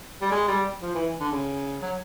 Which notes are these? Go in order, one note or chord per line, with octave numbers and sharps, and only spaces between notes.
G3
G#3
G3
F3
E3
D3
C#3
F#3